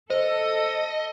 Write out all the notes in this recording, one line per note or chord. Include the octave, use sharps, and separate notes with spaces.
A4 C5 D#5